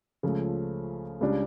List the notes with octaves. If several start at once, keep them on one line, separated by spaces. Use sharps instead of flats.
C#2 C#3 F3 A3
C#2 C#3 G3 D4